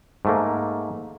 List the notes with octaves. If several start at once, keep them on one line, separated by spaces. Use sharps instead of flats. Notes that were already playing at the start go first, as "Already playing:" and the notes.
G#2 A3 A#3